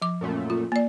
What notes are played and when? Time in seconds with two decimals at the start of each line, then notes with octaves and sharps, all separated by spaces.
0.02 F3 D6
0.21 F#2 A#2 A3
0.50 F4
0.72 A#3 D5